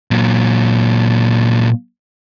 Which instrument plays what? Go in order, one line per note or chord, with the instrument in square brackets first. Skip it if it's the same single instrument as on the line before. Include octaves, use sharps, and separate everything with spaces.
[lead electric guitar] A#2 F#3